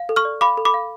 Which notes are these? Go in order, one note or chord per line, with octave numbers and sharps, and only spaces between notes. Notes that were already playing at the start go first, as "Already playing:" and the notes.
Already playing: F5
A4
C#6 F6
D5
F5 B5 D6
A4
B5 D6
F5